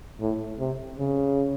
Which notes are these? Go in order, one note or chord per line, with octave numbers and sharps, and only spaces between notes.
A2
C3
C#3